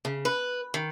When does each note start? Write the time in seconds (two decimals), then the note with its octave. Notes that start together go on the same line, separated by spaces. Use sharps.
0.05 C#3
0.25 B4
0.74 D#3